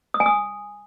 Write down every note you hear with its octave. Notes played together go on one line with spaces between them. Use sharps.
D#6
G#5
D#6